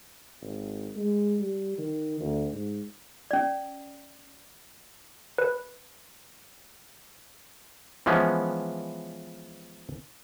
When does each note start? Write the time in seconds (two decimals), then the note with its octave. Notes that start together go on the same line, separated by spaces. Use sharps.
0.42 G#1
0.96 G#3
1.40 G3
1.78 D#3
2.20 D2
2.53 G#2
3.31 C#4 D5
5.38 B4
8.06 E3 F3 G#3 B3 C#4